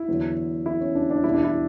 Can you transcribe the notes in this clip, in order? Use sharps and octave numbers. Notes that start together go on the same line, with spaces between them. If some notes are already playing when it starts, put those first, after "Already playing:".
Already playing: E4
E2 D3 F#3
E4
C#4
D4
D4
E2 B2 G3 E4
D4
E4